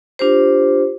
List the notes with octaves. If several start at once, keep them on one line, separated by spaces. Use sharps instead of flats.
D4 F4 G4 C5